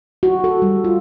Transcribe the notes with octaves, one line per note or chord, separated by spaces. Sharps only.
F#4
A4
G3
F4